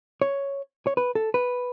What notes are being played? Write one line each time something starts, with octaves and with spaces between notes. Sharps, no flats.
C#5
C#5
B4
A4
B4